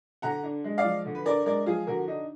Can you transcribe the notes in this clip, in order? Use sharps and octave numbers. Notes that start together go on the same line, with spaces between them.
D3 F#5 A#5
D4
G#3
D5 F5
F3
D3
B4
D4 A#4 D5
G#3 A#4 D5
F3 F4 G#4
D3 F#4 A#4
D4 D#4